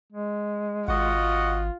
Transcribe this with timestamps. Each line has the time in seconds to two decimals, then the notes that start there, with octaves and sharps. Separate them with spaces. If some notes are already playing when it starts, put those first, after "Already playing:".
0.12 G#3
0.88 G#1 F4 F#4 D#5 F#5